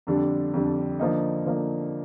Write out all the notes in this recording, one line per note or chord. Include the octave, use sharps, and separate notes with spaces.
F2 D3 G3 D4
F2 D3 G3 D4
D3 F3 A#3 D#4
D3 F3 A#3 D#4